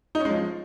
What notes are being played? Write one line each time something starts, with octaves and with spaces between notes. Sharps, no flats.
D#4
C#4
G#3
F3